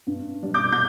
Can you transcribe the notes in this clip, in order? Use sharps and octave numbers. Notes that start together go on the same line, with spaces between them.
G2
G3 D4
D6 G6
G6